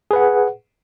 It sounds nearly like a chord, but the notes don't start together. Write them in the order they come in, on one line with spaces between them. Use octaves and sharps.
G#4 B4 F#5